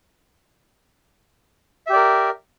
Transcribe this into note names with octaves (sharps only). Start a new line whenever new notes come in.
G4 A#4 D5 E5